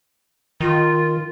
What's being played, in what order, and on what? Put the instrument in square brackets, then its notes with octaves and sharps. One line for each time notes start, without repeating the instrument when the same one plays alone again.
[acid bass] D#3 [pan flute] F4